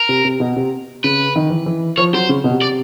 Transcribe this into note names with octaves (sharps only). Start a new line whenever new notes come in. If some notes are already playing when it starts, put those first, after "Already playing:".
Already playing: A#4
C3
C3
B2
C3
C#3 B4
D#3
E3
E3
F3 C#5
F#3 C5
C#3
B2
C3
D5